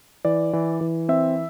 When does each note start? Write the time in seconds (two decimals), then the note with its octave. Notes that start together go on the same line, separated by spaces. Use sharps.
0.25 E3 D5
0.53 E3
0.81 E3
1.09 C4 E5